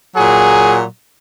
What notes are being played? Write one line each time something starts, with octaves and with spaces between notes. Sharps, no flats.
A#2 F#3 G#4